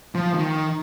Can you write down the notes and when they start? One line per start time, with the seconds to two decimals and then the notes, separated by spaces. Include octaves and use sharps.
0.15 F3
0.34 D#3